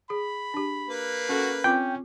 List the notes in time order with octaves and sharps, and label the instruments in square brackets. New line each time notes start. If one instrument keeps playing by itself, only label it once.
[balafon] G#4 [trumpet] B5
[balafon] D4 G4
[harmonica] A#3 B4
[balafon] C#4 A4 [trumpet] F#4
[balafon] C4 F4 D6 [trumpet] C#4 [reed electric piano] G5